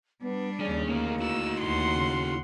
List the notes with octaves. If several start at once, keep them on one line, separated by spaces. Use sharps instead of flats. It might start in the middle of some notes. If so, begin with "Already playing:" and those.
G3 B3 D4
D#2 C#3 C#4 D5 G#5
D2 A#3 C#4 D#4 A#4
E4 F#4 E6
D#2 F#5 C6
C#3